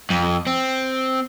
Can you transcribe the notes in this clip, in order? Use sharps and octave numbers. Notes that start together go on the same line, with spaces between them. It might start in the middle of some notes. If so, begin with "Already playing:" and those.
F2
C4